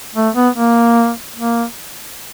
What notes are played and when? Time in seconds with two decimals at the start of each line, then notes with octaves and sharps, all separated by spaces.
0.15 A3
0.35 B3
0.55 A#3
1.36 A#3